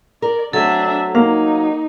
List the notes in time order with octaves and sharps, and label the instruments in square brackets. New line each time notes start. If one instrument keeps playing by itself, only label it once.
[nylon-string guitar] A#4 [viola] D5
[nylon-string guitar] F#3 A3 C4 [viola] D4 E5 [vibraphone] A4
[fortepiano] A#3 [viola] D#4 [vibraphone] F5